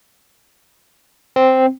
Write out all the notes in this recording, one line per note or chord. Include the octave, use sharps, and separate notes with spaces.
C4